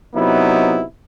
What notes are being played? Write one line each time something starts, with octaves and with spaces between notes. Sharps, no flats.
C3 F#3 B3 D#4 E4